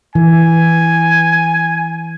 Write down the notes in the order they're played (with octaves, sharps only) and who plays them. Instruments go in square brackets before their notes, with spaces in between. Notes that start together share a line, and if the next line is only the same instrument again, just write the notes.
[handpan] E3 [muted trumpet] G#5